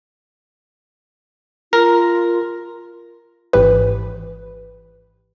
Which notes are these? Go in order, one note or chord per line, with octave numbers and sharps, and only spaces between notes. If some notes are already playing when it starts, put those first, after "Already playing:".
F4 A#4
G#1 G#2 E3 G4 B4